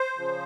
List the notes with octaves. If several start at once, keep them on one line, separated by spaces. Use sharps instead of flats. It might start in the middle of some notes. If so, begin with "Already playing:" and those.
Already playing: C5
C#3 F3